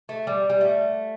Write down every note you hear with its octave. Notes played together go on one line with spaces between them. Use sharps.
A3
G3
G3
A3